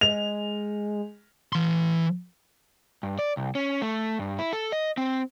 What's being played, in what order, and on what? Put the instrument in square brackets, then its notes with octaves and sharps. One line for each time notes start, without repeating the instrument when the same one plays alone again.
[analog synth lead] G#3 [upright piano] F7
[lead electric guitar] E3 C6
[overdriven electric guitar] G2
D5
C2
C#4
A3
G2
E4
A4
D#5
C4